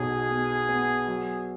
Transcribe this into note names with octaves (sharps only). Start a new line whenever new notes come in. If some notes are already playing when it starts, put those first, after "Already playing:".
Already playing: B1 B2 G#4
B3
B3
F#3